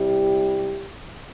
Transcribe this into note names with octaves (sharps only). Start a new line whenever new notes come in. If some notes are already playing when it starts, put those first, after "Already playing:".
Already playing: C3 G3 E4 G4